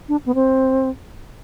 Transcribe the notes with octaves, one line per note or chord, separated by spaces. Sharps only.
D4
B3
C4